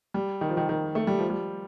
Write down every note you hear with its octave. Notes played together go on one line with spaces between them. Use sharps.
G3
D#3
F3
D#3
D#3
A3
G3
F3
G3